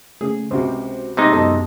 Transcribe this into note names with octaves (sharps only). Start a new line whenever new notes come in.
C#3 A3 G#4
C#2 C3 F#4 C5
C3 G#3 C4 D#4
F#2 B2 A4 D#5